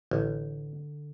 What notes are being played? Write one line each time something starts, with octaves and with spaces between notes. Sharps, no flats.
A1 D3